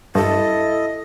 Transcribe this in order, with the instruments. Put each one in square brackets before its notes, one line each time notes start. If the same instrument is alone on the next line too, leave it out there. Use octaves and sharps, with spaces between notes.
[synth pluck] G2 [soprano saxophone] E4 [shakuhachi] A4 [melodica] D#5